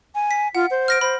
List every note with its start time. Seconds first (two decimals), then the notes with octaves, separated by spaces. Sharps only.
0.15 G#5
0.31 B6
0.55 F4 F#5
0.71 C5
0.88 F6 A#6 D7
1.01 C5 B5